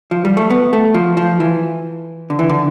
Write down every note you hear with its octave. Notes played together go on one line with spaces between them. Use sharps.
F3
G3
A3
B3
A3
F3
F3
E3
D3
E3
D3